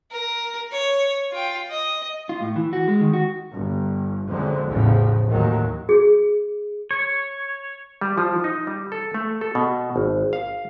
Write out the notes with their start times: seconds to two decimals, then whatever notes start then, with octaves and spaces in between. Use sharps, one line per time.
0.11 A#4
0.72 C#5
1.31 F4 G5
1.70 D#5
2.29 F4
2.41 A2
2.56 E3
2.73 F#4
2.88 G#3
3.01 D#3
3.13 F#4
3.54 G1
4.27 F#1 F2 D3 F#3 G#3
4.67 A1 E2 A2 C#3 F3
5.28 A1 D#2 A2 D#3 F#3
5.89 G#4
6.91 C#5
8.01 G3
8.18 F3
8.44 D#4
8.67 G3
8.92 A4
9.14 A3
9.41 A4
9.55 B2
9.96 G#1
10.33 F5